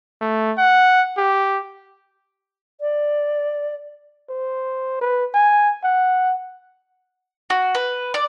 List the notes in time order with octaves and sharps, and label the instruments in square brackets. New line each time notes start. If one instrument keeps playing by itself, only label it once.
[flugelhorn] A3
F#5
G4
[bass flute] D5
[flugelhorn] C5
B4
G#5
F#5
[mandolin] F#4
B4
D5